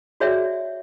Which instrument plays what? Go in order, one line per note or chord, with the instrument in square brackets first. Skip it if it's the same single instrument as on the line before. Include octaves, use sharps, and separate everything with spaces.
[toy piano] F#4 G#4 C#5 D5 E5 G5